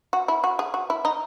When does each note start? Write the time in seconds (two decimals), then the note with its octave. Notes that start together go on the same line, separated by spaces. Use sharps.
0.13 F#4
0.28 E4
0.44 F#4
0.59 G#4
0.74 F#4
0.90 E4
1.05 D#4